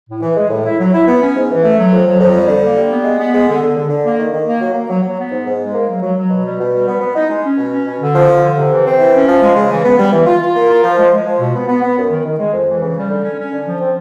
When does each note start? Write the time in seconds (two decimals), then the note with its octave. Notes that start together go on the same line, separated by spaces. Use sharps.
0.09 A2
0.22 E3
0.37 G#3
0.50 A2
0.65 E4
0.79 F#3
0.93 E4
1.07 B3
1.21 C#4
1.35 G#2
1.50 E3
1.63 A3
1.78 F#3
1.91 F2
2.06 F#3
2.20 F2
2.34 G3
2.48 D3
2.62 A#3
2.77 G3
2.90 B3
3.04 G#3
3.19 B3
3.34 G#3
3.48 D3
3.62 D3
3.76 D3
3.89 D3
4.04 A#3
4.19 D#3
4.33 D#3
4.46 A#3
4.61 F#3
4.74 A#3
4.89 F#3
5.03 F#3
5.18 B3
5.31 G#2
5.46 G#2
5.60 G#3
5.74 A#3
5.88 F#3
6.02 F#3
6.17 F#3
6.30 B2
6.44 G3
6.59 B2
6.72 G3
6.87 B3
7.01 B3
7.15 D#4
7.30 G#3
7.44 C#4
7.58 B2
7.72 C#4
7.87 B2
8.00 D3
8.15 F3
8.29 D3
8.43 D3
8.57 C3
8.71 E3
8.85 C4
8.99 E3
9.13 C#4
9.28 F3
9.41 G#3
9.56 C#3
9.71 E3
9.84 B3
9.99 G3
10.12 E3
10.26 F4
10.41 F4
10.55 A#3
10.69 F4
10.83 F3
10.97 G#3
11.11 G#3
11.26 F3
11.39 B2
11.55 B3
11.68 B3
11.82 B3
11.97 F#2
12.10 D#3
12.24 D#3
12.38 G#3
12.53 F2
12.68 E3
12.81 C#3
12.96 G3
13.10 D3
13.24 C#4
13.38 C#4
13.52 D3
13.67 F3
13.81 C4